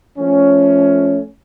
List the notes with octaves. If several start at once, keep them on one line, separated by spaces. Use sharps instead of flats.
F3 A3 C#4